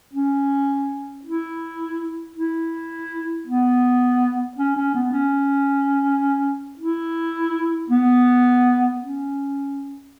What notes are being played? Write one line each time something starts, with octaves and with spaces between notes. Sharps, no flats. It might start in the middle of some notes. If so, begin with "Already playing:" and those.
C#4
E4
E4
B3
C#4
C#4
B3
C#4
E4
B3
C#4